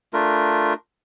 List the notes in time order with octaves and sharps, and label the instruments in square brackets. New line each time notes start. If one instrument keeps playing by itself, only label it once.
[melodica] A3 D4 F4 A#4